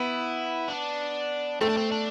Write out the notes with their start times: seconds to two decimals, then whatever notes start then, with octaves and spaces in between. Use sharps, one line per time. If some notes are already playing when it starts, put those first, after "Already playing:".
Already playing: B3 E4
0.69 D4
1.61 A3 C4
1.69 D4
1.77 C4
1.92 D4